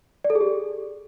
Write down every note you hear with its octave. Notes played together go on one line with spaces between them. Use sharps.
D5
A4
G#4
G4